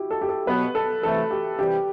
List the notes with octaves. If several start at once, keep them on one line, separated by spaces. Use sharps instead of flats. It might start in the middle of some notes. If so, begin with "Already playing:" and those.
Already playing: E4 F#4 G4
A4
G4
A4
B2 F#3 B3 B4
A4
C3 E3 A3 A4
G4
C3 E3 G3 G4